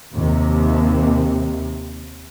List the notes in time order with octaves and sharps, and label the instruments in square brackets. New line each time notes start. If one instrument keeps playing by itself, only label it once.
[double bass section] D#2 C3